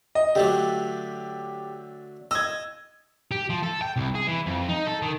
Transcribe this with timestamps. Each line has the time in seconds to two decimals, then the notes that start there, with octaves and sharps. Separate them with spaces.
0.15 D#5
0.35 D3 F#3 A3 G4
2.31 D#5 E6 G#6
3.31 G4
3.50 F3
3.63 A4
3.82 G5
3.96 C2
4.15 G#4
4.27 E3
4.47 F2
4.69 D#4
4.87 A4
5.02 D#3